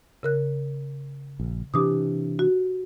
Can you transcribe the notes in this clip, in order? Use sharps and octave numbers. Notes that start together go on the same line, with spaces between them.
C#3 A#4 F#6
A#1
C3 E3 D4 G4 D6 D#6
F#4